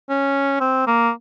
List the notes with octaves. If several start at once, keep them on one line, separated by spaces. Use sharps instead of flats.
C#4
C4
A#3